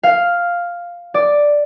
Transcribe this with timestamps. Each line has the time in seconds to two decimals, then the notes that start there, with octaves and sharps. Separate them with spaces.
0.03 F5
1.14 D5